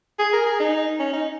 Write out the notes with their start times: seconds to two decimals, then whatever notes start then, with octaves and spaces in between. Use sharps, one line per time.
0.19 G#4
0.33 A#4
0.46 G#4
0.60 D#4
0.99 C#4
1.13 D#4